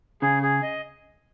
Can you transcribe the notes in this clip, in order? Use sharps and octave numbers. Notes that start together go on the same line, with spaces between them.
C#3 G#4
G#4
D#5